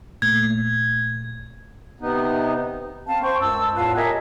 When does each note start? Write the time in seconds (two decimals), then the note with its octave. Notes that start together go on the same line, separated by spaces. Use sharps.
0.22 A#2 A3 G#6
2.01 C3 B3 D#4
3.08 C4 F5 A5
3.23 C5 G5 C#6
3.41 C#2 F#2 A5 E6
3.76 E2 A2 F4 B4 F5 A5
3.96 G4 A#4 C#5 D#5 E5 G#5